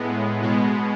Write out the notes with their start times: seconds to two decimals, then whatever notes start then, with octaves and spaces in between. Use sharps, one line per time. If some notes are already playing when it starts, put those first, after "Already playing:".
Already playing: A2 G#3 B3
0.42 B2 G#3 B3